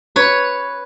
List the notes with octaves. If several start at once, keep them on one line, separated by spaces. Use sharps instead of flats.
B4 C#5